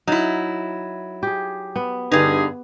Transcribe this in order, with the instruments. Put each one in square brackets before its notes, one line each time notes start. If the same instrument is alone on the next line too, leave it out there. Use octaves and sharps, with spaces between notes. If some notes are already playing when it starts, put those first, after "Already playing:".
[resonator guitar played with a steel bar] F#3 E4 [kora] D#4
[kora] G4 G#4
B3
[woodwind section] G2 G#4 [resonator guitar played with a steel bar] D3 D#4